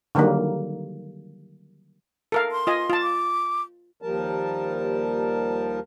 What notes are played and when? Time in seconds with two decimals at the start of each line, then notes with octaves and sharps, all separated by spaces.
0.15 D3 D#3 F#3 G3 A#3
2.32 A4 A#4 F5
2.52 C6
2.67 F4 D#5 G#5
2.90 F4 A5
3.02 D6
4.02 D#2 F3 G3 A#4 A5